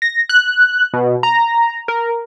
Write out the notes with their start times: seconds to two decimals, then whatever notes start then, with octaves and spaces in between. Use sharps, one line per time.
0.02 A#6
0.29 F#6
0.93 B2
1.23 A#5
1.88 A#4